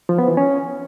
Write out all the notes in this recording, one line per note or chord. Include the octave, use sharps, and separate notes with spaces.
F3
B3
E3
C#4